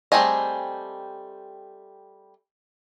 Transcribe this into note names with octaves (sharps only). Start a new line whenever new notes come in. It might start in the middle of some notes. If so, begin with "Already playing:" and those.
G3 A3 C4 G#4 D#5